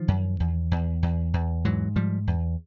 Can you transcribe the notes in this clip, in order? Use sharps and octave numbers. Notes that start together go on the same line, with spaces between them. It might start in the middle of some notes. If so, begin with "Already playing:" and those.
Already playing: D#3 F3
F#2
E2
E2
E2
E2
G#2 E3 F#3
G#2 F3 G3
E2